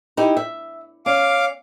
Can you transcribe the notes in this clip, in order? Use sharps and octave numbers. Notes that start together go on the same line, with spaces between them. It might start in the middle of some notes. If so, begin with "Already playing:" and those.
D#4 E4 G4
E5
C#4 F5 D6